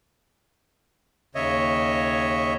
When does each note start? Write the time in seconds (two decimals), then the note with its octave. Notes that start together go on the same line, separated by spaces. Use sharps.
1.35 D#2 C#3 C#5 D#5 E5